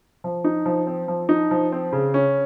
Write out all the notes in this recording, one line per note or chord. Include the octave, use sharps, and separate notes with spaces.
F3
D#4
F3
C4
F3
D#4
F3
C4
C#3
C#4